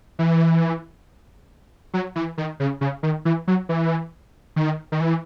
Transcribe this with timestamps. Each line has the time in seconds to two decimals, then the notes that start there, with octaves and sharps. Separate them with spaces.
0.19 E3
1.94 F#3
2.16 E3
2.38 D#3
2.60 C#3
2.81 C#3
3.03 D#3
3.25 E3
3.48 F#3
3.69 E3
4.56 D#3
4.92 D#3
5.00 E3